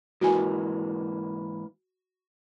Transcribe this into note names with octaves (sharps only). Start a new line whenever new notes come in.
G#2 E3 A#3 F#4 G#5